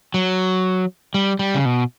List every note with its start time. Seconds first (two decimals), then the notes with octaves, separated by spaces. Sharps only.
0.14 F#3
1.14 G3
1.39 G3
1.55 C#3
1.65 B2